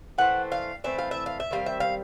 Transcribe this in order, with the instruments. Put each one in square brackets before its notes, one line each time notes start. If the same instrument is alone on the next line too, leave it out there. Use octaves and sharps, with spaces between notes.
[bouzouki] E3 A3 C4 F#5
F5
E3 A3 C4 E5
F5
E5
F5
E5
D#3 G3 C4 F5
E5
F5